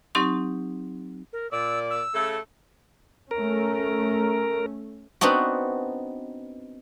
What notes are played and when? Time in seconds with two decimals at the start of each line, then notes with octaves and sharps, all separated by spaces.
0.15 F#3 C4 D#4 G4 C6 C#6
1.33 A#4
1.51 A#2 D5 E6
1.90 E6
2.14 C#3 A3 A4
3.31 A3 C#4 A#4
5.21 B3 C4 D4 D#4 F#4